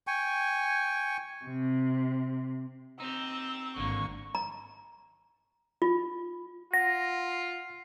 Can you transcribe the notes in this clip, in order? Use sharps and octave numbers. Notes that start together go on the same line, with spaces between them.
G5 G#5 C#6
C3
C4 D#4 G4 E6
G#1 D3 A#3 C#6
A#5
F4
F4 F#5 A#6